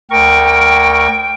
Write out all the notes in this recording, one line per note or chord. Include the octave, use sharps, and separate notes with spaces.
D2 A#4 G5 C#6